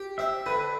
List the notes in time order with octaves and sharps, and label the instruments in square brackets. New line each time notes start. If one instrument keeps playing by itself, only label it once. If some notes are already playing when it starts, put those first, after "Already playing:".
Already playing: [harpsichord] G4
[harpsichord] C4 [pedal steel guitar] E5
[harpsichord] D3 [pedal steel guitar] B4